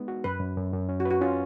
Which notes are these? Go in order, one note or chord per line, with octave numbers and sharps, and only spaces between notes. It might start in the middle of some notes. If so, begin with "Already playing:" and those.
Already playing: G#3 B3 D#4
F#4
F#2 B4
F#2
F#2
F#2
C#4
F#4
B4
F#4
C#4 F4